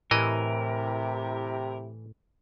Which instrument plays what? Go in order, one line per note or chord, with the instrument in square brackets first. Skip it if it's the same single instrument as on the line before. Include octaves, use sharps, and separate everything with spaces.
[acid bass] A2 [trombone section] C3 E4 G4 [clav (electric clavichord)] E3 D#5 [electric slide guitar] A#4